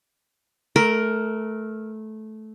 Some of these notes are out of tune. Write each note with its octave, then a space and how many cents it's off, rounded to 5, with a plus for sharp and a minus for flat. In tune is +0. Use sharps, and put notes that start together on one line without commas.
A3 -15 A#4 +5